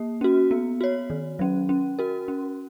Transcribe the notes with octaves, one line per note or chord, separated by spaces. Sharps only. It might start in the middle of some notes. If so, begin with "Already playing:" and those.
Already playing: A#3
C#4 F#4
B3
F#4 C#5
D#3
F#3 C#4
C#4
F#4 A#4
C#4